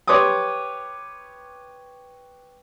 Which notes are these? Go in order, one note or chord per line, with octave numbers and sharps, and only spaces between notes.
G4 B4 C#5 C6 D6 D#6